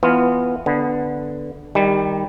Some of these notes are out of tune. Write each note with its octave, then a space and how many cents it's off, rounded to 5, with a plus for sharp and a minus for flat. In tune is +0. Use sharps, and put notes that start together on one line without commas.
E3 +10 B3 +0 F4 +0
D3 +0 B3 +0
D#3 +0 G3 +15